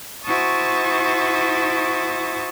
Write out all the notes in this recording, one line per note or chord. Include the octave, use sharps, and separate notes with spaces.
E4 F#4 C5 A5 C#6 D#6